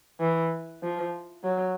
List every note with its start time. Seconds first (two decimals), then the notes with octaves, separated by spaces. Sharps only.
0.20 E3
0.83 F3
1.44 F#3